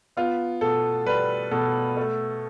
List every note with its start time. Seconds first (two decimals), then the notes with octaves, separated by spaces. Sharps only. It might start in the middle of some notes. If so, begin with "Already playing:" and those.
0.17 B3 F4
0.61 B2 A4
1.06 G3 B4
1.51 B2 A4
1.97 A3